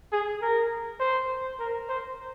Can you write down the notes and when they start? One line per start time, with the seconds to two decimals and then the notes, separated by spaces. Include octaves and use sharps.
0.12 G#4
0.41 A#4
1.00 C5
1.59 A#4
1.89 C5